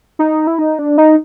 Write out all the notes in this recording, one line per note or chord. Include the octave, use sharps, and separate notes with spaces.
D#4
E4
D#4
D4
D#4